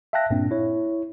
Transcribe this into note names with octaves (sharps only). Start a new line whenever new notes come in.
E5 F5 G5 A5 F#6 A#6
G2 A#2 A#3 C4 D4
E4 C#5